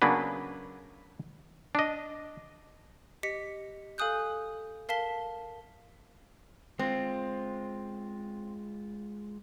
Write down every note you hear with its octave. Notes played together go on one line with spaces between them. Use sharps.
C#3 F#3 A#3 B3 D4 B4
D4 D#5
G4 D#5 B6 C#7
A4 F5 G#5 D#6 F#6 G6
A#4 F5 A5 B6 G7
G#3 C4 F4